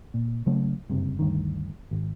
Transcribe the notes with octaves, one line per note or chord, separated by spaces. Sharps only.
A#2
C#3 F#3 A3
F#1 G2 C3
D2 G2 D#3
G#1